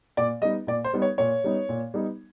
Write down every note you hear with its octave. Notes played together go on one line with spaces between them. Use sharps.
A#2 D5
G3 B3 D#4 D#5
A#2 D5
C5
G3 B3 D#4
C#5
A#2 C#5
G3 B3 D#4
A#2
G3 B3 D#4